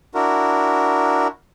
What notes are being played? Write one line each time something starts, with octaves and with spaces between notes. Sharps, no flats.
D4 E4 F#4 A#4